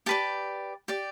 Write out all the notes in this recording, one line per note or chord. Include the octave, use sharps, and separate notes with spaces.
G4 B4 D5 A5
G4 D5